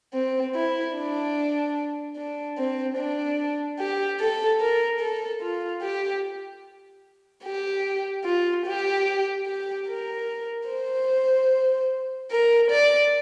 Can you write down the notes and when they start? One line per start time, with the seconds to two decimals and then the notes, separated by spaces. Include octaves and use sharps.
0.14 C4
0.55 E4
0.96 D4
2.16 D4
2.58 C4
2.98 D4
3.79 G4
4.20 A4
4.60 A#4
5.00 A4
5.41 F4
5.82 G4
7.44 G4
8.25 F4
8.66 G4
9.47 G4
9.88 A#4
10.69 C5
12.32 A#4
12.71 D5